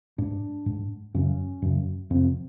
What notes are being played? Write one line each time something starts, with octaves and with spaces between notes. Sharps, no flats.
G#2 D4
G#2
F#2 C#3 C#4
F#2 C#3
F2 C3 C4